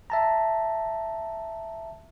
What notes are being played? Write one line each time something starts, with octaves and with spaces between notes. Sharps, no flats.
E5 A5 A#5